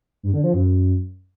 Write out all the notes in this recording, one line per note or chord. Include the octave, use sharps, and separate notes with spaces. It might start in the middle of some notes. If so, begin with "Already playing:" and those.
G2
D3
F3
F#2